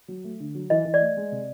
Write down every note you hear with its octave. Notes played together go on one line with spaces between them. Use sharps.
F#3
A3
D3
F#3
E3 D#5
E3
D5
A3
G#3
C3